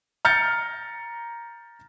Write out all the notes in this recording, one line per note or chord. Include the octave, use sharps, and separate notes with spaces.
A#5 F6 G6 A6 C#7